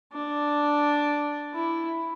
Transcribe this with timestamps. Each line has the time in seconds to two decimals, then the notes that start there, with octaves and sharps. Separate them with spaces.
0.12 D4
1.54 E4